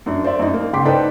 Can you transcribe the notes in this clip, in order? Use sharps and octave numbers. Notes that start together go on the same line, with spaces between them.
F#2 D4
C5 D5 E5
F#2 D#4
A#3
G#2 C#3 G5 C6 D6 B6
D#4 A4 B4 C5 D5 G5